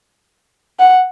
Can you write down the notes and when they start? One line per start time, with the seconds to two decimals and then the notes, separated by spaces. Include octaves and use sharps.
0.80 F#5